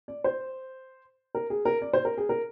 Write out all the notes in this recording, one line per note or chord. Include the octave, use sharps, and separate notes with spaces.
D5
C5
A#4
G#4
A#4
D5
C5
A#4
G#4
A#4